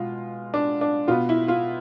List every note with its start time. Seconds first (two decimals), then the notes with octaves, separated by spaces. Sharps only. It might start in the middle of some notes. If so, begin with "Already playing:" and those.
Already playing: B2 G#3 F4
0.54 D4
0.81 D4
1.07 B2 B3 F4
1.29 E4
1.48 F4